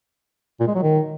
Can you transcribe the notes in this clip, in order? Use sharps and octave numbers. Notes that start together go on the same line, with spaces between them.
A#2
G#3
F#3
D#3